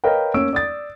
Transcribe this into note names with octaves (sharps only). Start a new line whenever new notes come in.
A#4 B4 C#5 D#5 F5 G5
A#3 C#4 E6 D7
D5 D#6 A6